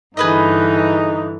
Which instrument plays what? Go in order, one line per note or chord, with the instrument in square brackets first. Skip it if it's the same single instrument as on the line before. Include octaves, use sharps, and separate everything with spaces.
[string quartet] G2 D3 E3 [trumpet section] D#4 [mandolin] G#4 B4 D#5